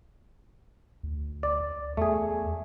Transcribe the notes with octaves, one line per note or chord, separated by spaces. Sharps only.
D2
D5
E2 A3 G#4